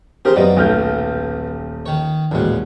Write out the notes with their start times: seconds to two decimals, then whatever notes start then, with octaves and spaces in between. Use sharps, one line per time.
0.25 C4 G4 G#4 A#4 C5
0.36 F#2 A#3 B3 G4 D5 D#5
0.57 D#1 B1 A3 F6 G6
1.86 D#3 C#5
2.31 A1 D#2 A#2 G#3 F#4